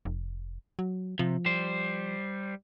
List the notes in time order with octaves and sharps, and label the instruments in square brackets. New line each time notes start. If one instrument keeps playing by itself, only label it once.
[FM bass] F1
F#3
[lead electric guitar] C3 [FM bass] F3
[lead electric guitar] G3 C5